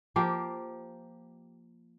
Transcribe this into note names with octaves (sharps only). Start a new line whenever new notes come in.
F3 A#3 G4 G5